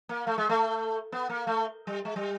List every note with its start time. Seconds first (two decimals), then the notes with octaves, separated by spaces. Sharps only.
0.09 A#3
0.27 A3
0.38 G#3
0.49 A3
1.12 B3
1.30 A#3
1.47 A3
1.87 G3
2.05 G#3
2.16 G3